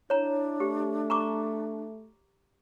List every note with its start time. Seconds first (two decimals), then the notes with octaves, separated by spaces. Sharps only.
0.10 D4 E4 C#5 A#5
0.60 A3 G4
1.10 A#5 C#6 D6